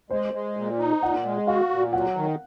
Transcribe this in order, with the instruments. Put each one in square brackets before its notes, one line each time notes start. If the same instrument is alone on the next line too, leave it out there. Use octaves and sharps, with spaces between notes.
[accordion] G#3 [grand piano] C5
[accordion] G#3
A#2
D#4
[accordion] A#2 [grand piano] F#5
[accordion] G#3
[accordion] F#4 [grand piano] F5
[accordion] A#2
[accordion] F#3 [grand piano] F#5
[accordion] D#3